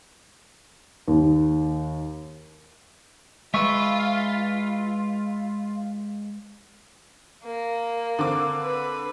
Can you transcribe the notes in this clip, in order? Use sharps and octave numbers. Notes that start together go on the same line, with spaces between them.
D#2
G#3 F4 B4 E5 C#6 E6
A#3
D3 C4 D6
B4